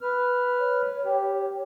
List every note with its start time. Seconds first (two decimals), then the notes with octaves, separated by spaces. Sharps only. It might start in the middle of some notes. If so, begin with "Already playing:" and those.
0.01 B4 F6
0.59 C#5
1.05 G4